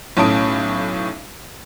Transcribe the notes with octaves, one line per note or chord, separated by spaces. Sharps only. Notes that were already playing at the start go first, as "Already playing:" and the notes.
B1 A2 C#4 A5 D#6 D7